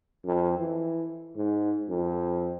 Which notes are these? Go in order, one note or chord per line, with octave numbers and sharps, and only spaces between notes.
F2
E3
G#2
F2